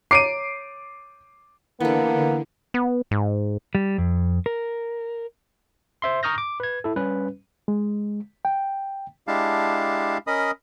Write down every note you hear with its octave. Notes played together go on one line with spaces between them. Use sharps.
C#5 A#5 D6 C7 D7 D#7
D3 E3 A#3 B3 A4
B3
G#2
G3
F2
A#4
C5 E5 C6
A#5 C#6 D#6 F6 G6 A#6
D6
B4 G#6
E4 A4
G3 C#4 B4
G#3
G5
G#3 D4 E4 G4 F5 A5
C#4 A#4 D#5 B5 D#6